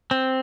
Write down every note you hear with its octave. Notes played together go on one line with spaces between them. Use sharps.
C4